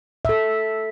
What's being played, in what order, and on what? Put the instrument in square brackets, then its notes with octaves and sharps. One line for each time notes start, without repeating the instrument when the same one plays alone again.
[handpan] A4 E5